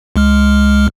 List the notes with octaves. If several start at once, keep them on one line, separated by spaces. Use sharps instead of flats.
C#2 G#3 F6